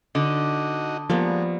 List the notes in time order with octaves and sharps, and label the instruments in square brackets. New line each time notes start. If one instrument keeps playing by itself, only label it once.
[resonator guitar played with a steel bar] D3 [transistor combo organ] D#4 F#4 D#5
[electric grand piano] F3 [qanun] G3 A#3 B3 [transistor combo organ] G#3